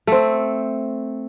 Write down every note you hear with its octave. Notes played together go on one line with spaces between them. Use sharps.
A3 C4